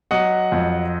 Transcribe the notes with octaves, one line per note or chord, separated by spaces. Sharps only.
F#3 D#5 F#5
F2